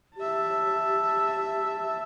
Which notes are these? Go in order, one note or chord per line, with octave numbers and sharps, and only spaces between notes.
G4 E5 A5